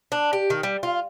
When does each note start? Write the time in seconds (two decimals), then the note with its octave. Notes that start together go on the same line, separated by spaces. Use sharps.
0.12 D4
0.33 G4
0.50 D#3
0.63 G3
0.83 F4